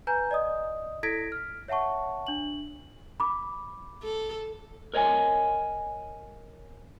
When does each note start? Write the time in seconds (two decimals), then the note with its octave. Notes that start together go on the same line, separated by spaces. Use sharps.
0.07 B4 G#5 A#5 G6
0.31 D5 D#5 D#6
1.03 E4 A4 G#6 A#6 B6 D7
1.32 F6
1.68 C#5 E5 F#5 A5 C#6
2.27 D4 F#7
3.20 B5 D6
4.03 A4
4.94 A#4 C#5 D#5 G5 G#5